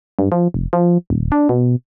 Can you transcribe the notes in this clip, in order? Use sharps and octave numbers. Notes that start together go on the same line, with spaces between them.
G2
F3
F1
F3
D#1
D4
B2